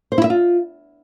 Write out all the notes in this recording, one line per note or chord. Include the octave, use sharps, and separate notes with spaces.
C5
E4
E5
F4